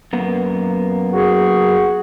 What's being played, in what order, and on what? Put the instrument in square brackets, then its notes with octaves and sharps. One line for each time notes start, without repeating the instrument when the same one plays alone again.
[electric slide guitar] F#2 A#3 B3
[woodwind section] F#4 G#4